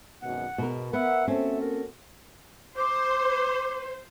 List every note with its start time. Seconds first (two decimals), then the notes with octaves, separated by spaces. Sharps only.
0.22 G#1 F#2 B2 F#5
0.58 G#2 B2 A#4
0.93 B3 A#4 E5 F#5
1.28 A#3 C4 C#4 F#4 A4 E5
1.61 A#4
2.78 C5 D6